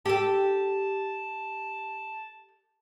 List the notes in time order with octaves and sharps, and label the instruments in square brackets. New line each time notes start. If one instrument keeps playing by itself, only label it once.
[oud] G4 A4 [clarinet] A5